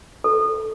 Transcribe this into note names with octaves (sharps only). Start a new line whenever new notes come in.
A4